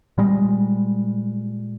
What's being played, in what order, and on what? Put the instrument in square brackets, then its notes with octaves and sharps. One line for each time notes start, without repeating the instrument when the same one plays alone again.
[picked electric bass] A#2 G3 G#3